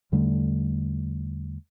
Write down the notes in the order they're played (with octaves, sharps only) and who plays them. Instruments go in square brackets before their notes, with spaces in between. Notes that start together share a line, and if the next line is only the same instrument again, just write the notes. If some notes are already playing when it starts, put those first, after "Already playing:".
[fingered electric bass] E2 D3 G3 A3